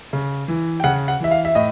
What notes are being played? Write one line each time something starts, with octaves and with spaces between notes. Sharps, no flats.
C#3
E3
G5
C#3 F#5
F#5
E3 E5
F5
E5
A2 D#5